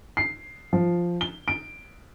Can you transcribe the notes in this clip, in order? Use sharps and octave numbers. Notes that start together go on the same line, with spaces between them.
C7
F3
G7
D7